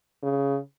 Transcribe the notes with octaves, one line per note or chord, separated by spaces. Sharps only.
C#3